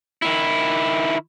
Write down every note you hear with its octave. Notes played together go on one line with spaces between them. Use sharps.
D#3 E4